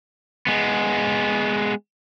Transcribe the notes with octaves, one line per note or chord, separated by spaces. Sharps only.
G#3 B3